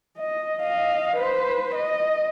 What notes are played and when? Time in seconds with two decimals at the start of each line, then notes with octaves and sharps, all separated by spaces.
0.18 D#5
0.62 D#5 F5
1.17 B4 C5
1.75 D#5